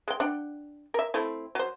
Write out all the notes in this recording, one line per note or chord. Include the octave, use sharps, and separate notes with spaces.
G#3 G5
D4 F#5 G5
A#4 E5
A3 C4 E4
F#3 C5